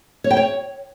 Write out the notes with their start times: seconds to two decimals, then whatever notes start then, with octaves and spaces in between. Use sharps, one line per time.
0.24 C#5
0.31 G5
0.37 C#5